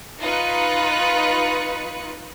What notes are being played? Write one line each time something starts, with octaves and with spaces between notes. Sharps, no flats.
D#4 F4 B4 B5 F#6 C#7